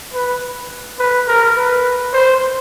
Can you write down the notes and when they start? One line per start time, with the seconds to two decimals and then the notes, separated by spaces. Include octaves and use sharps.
0.14 B4
0.99 B4
1.28 A#4
1.57 B4
2.13 C5